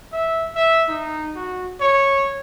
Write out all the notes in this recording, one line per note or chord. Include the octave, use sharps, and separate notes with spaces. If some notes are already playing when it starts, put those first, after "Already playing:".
E5
E5
D#4
F#4
C#5